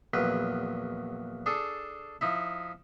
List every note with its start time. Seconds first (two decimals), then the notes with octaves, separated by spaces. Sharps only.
0.14 A#1 E2 F#3 B4
1.46 D4 G#4 A4
2.21 F3 D#4 E4